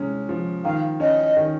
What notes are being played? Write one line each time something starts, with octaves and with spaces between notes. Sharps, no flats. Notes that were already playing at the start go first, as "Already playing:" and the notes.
Already playing: C3 G#3 C#4
F3
D#3 F5
C#4 D#5
D#3